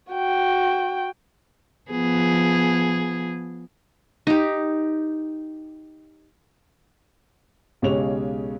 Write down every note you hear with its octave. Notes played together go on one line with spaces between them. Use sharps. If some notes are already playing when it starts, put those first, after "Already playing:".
F#4 G5
F3 B3 G#4
D#4 G4
B1 C#3 G#3 G4 C#5 F7